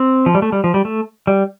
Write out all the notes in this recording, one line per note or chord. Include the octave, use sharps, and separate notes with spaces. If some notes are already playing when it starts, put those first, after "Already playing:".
Already playing: C4
F3
G3
A3
G3
F3
G3
A3
G3